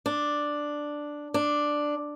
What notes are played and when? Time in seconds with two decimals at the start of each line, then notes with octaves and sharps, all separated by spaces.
0.06 D4
1.34 D4